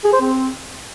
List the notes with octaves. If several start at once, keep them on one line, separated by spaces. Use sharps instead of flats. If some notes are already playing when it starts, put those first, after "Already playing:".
G#4
C5
C4